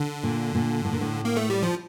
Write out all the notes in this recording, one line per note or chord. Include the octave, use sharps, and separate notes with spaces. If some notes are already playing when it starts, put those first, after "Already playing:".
Already playing: D3
A#2
A#2
A2
A#2
A2
A#3
A3
G3
F3